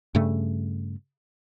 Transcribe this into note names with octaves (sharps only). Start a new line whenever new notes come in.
G2 C#3 A3